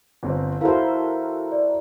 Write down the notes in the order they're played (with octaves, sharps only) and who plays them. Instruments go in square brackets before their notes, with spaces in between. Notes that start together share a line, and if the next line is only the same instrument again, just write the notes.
[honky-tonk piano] G1 C4
[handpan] E4 C5 [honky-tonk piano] F#4 A4 A#4 [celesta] F5
[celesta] D5